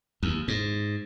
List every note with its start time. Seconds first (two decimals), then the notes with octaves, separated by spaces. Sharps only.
0.23 D#2
0.48 G#2